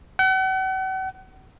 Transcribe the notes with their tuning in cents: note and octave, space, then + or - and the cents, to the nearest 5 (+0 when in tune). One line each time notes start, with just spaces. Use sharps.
F#5 +40